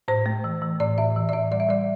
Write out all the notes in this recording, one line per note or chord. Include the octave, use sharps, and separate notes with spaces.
A2 C5
A3
E3
E3
A2 D5
A2 E5
E3
D5
A2 E5
G3 D5
E5
G3 D5